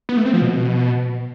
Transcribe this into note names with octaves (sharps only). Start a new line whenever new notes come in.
B3
A3
C4
F3
B2